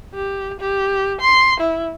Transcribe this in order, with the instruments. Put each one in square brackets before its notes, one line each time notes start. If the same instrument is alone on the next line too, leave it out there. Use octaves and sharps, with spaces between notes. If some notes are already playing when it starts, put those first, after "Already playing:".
[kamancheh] G4
G4
C6
E4